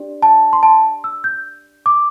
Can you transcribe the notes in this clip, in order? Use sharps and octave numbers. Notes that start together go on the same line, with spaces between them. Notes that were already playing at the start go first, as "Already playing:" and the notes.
Already playing: D4 G4 D5
A5
C6
A5
E6
G6
D6